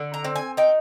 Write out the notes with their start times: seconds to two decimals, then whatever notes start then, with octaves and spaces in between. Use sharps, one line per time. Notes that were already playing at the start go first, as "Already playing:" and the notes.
Already playing: D3
0.14 A#5
0.24 C4
0.36 G#5
0.57 D#4 G5